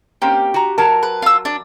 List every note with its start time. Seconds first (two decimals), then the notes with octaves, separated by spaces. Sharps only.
0.22 A#3 C4 C#4 G4
0.54 F#4 A#5
0.78 F#3 A#4 A5
1.03 B4
1.22 F4 E6
1.45 D4